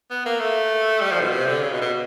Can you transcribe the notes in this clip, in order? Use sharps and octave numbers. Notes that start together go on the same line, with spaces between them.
B3
A#3
A3
G3
F3
B2
C3
D3
C#3
B2
B2